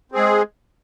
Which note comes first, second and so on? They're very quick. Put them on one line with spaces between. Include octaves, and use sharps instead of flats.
C4 G#4 G#3